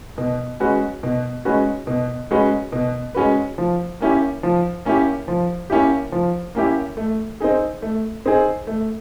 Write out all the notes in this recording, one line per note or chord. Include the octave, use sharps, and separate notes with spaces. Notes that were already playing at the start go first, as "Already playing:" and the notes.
B2
G#3 C#4 F#4 B4
B2
G#3 C#4 F#4 B4
B2
G#3 C#4 F#4 B4
B2
G#3 C#4 F#4 B4
F3
A#3 C#4 E4 G4
F3
A#3 C#4 E4 G4
F3
A#3 C#4 E4 G4
F3
A#3 C#4 E4 G4
A3
C4 D#4 G#4
A3
C4 D#4 G#4
A3